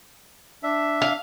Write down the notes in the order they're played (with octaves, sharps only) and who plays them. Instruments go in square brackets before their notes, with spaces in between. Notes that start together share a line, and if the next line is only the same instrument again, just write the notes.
[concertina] D4 E5
[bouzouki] F5